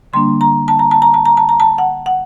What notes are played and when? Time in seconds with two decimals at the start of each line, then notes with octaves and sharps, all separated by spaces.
0.13 D3 G3 A#3 D4 C6
0.41 A#5
0.68 A5
0.79 A#5
0.91 A5
1.02 A#5
1.14 A5
1.26 A#5
1.37 A5
1.49 A#5
1.60 A5
1.78 F#5
2.06 F#5